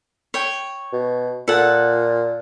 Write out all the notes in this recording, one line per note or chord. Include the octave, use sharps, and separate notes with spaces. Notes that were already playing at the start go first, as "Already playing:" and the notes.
C#5 G5
B2
A#2 A4 F#5